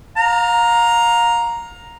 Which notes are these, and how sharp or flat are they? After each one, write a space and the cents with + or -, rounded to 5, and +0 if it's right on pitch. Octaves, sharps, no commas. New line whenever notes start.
F5 +30 A#5 +5